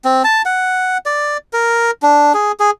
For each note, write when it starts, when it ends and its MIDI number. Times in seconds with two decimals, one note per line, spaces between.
0.05 0.23 60
0.24 0.42 81
0.45 0.98 78
1.06 1.37 74
1.53 1.91 70
2.03 2.33 62
2.34 2.52 68
2.60 2.71 68